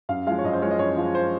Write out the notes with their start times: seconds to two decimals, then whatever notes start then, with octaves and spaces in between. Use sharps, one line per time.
0.09 F#2 F5
0.27 F3 G#3 F5
0.38 C#5
0.44 F#2 D#5
0.53 C5
0.62 G#3 C#5
0.65 F3
0.71 D#5
0.79 F#2 C#5
0.97 F3 G#3
1.15 C5